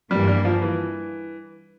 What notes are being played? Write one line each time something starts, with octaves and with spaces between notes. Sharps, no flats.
G2 E3 G3 A#3
G3
F3
E3